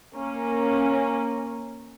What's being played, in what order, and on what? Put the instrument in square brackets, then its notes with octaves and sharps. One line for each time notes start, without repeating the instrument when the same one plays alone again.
[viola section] A#3 C#4 A#4